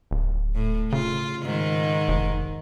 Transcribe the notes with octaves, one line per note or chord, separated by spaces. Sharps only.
D1
A2
C#3 F4
G#2 D#3
F1